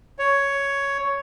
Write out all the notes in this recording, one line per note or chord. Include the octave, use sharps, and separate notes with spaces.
C#5